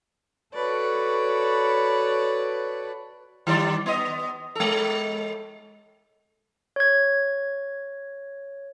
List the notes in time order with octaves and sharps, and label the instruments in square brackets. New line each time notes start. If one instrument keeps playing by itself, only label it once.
[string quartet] F#4 A4 B4 C#5 D5
[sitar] D#3 G3 D5
B3 D#5
G#3 A4
[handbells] C#5 G#6